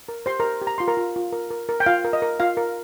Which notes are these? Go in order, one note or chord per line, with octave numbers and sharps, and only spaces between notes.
A#4
G4 C5 C6
A#4 A#5
G4
G4
A#5
F4 C6
A#4 A#5
F4
F4
A#4
A#4
A#4
G5
F4 F5
A#4
D#5
A#4
F4 F5
A#4